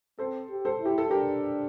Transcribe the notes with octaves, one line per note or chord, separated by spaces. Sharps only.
C4 A4 C5
G4
A4 C5
E4
G4
A4
D4 G4 A#4